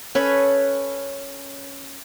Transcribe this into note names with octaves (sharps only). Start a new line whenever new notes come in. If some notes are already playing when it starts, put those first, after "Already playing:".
C#4 A4 B4 C#5